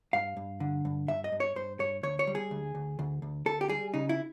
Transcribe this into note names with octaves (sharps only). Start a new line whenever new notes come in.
G2 F5
G2
D3
G2
G2 E5
D#5
G2
C#5
G2 C5
G2 C#5
D2 C#5
C#5
G3
G#4
D2
D2
D2
D2
D2 A4
G4
G3 G#4
C#3 D#4
E4